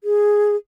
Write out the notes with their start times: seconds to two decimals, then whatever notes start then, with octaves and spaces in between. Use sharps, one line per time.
0.04 G#4